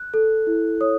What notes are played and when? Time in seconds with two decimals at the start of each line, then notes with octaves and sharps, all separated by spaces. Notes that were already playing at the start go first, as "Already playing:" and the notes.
Already playing: F#6
0.14 A4
0.47 E4
0.81 C#5 D#6